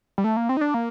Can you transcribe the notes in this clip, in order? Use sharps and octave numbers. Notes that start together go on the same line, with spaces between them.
G3
A3
A#3
C4
D#4
D4
A#3